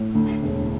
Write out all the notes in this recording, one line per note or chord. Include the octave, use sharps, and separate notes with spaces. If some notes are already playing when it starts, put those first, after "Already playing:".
Already playing: A2
D2
E1